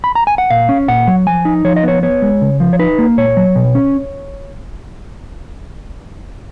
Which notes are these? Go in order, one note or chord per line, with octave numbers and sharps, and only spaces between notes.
B5
A#5
G#5
F#5
A#2 F5
C#4
A#2 F#5
F#3
F3 G#5
D#4
F3 C#5
D#5
B3 C#5
B3 C#5
G#3
C#3
F3
C#5
D#4 B4
A#3
A#2 C#5
F#3
B2
C#4